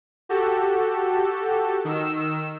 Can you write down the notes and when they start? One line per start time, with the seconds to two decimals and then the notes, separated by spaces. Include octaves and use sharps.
0.29 F#4 G4 A4
1.85 D#3 E6